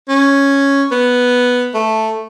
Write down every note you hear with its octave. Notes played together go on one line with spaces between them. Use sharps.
C#4
B3
A3